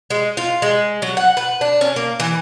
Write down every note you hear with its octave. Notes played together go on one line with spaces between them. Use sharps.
G#3
F4
G#3
F#3
F#5
B4
D4
C#4
A#3
E3